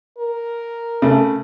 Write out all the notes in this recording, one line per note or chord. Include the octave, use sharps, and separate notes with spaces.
A#4
C#3 A3